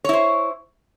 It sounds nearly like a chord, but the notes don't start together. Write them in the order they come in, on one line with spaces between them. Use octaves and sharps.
C#5 E4 C5